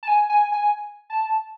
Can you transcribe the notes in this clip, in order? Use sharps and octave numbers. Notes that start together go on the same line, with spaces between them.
A5
G#5
G#5
G#5
A5